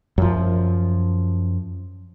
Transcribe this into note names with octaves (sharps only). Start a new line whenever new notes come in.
F#2 F3